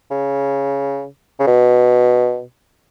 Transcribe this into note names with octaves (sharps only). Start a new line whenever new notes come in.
C#3
C#3
B2